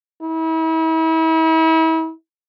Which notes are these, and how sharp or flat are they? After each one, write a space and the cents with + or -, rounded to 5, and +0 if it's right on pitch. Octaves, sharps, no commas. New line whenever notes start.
E4 -40